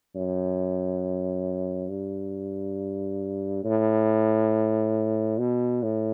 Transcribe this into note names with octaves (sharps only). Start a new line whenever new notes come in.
F#2
G2
A2
B2
A2